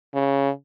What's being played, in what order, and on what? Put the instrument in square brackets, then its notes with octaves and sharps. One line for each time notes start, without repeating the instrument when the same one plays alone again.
[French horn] C#3